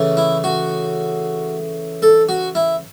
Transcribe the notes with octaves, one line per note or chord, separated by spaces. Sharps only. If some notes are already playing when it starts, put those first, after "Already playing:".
Already playing: C#3 E3 A3
E4
F#4
A4
F#4
E4